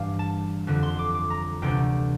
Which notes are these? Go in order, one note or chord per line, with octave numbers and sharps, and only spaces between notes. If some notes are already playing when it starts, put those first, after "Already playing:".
Already playing: G2 E3 G3 D4 F5
A5
F2 D3 G3
C6
D6
D6
A#5
D2 C3 E3 G3 D4 G5